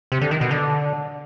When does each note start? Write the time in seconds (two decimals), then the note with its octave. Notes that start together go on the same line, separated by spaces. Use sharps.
0.12 C3
0.21 D3
0.31 D#3
0.41 B2
0.51 D3